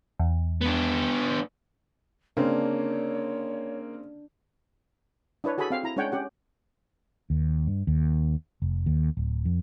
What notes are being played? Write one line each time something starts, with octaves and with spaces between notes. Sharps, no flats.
E2
B3 D4
C#3 A#3 C4 D4 C#5
D4 E4 B4 C#5
F#4 G#4 A4 G#5 B5
C4 F5
E4 A#5
G#3 C#4 D4 C#5 F#5 G5
C#4 G4 F#5
D#2
G2
D#2
F1
D#2
D1
F2